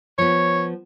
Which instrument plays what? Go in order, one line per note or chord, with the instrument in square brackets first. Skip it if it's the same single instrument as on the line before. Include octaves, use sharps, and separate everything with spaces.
[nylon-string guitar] F3 B3 [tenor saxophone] C#5